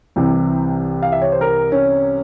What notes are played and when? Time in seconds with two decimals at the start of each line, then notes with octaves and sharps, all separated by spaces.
0.16 C2 C3 E3 G5
1.03 F5
1.12 E5
1.22 C#5
1.32 C5
1.41 A#4
1.72 C#4